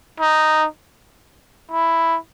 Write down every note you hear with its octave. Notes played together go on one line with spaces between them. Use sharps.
D#4
E4